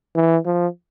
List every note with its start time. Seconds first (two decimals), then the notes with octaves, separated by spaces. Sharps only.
0.16 E3
0.46 F3